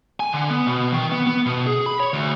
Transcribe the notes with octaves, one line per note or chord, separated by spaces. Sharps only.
G#5
D3
B3
B2
D#3
B3
B3
B2
G#4
B5
C#5
D2